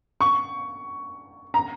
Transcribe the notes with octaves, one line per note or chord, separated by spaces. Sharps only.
C#6
A#5